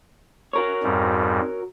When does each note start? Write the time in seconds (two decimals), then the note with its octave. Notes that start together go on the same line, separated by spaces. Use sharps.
0.53 F#4 A#4 C#5
0.83 F2 G#2 G3